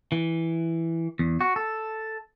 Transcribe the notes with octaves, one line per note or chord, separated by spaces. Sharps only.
E3
E2
F#4
A4